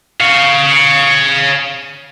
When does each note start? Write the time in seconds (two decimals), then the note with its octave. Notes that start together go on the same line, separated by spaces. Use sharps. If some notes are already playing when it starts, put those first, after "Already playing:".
0.21 C#5 F5